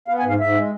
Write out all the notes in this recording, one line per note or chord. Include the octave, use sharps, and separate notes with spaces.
B3 F5
G#5
G#2 F5
G#2 E5
G#3